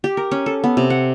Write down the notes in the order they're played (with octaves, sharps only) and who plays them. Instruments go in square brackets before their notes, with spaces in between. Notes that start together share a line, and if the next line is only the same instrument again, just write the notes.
[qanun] G4
A#4
C#4
A4
B3
C3
F#5